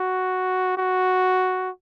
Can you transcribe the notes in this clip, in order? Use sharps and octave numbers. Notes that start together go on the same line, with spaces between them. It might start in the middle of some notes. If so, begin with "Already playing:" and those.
Already playing: F#4
F#4